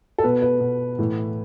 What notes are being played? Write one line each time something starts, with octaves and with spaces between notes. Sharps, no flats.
A4
B2 B4
B4
B2
A2 E3